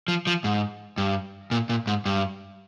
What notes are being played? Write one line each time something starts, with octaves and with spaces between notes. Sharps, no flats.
F3
F3
G#2
G2
A#2
A#2
G#2
G2